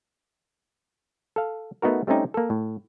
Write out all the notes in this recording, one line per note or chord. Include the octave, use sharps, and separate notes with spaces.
A4 F5
A3 B3 D#4 F#4 A#4
G3 A3 C4 C#4 D#4 G4
A#3 A4
A2